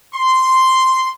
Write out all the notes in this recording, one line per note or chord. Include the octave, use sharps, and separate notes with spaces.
C6